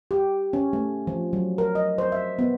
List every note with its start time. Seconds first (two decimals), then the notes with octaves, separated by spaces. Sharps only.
0.11 G4
0.53 C#4
0.73 A3
1.07 F3
1.33 F#3
1.58 A#4
1.75 D#5
1.98 C5
2.12 E5
2.39 B3